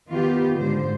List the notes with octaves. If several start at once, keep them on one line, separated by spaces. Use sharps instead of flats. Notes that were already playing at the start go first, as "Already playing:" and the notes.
D#3 B3 F4 G4
G#2 D3 C5